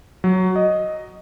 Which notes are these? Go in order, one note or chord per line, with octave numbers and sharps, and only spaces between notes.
F#3
D#5